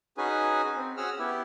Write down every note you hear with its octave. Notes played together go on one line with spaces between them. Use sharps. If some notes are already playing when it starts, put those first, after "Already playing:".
C#4 D#4 F#4 G#4 B4 G#5
C4
C#4 F#4 G#4 F#5 E6 F6
B3 E4 G4